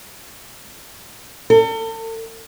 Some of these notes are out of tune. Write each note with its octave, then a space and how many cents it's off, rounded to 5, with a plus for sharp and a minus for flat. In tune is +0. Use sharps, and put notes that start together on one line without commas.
A4 +40